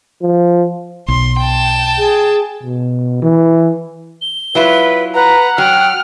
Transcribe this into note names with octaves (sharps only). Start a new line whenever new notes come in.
F3
B1 C6
G5 A5
G#4
B2
E3
G7
F#3 E4 F4 B4
B4 F#5 A#5
F#3 G5 F6